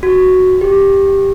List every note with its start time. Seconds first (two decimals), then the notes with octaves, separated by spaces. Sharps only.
0.03 F#4
0.61 G4